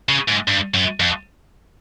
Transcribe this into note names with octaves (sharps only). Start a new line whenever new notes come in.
C#3
G#2
G2
F#2
F2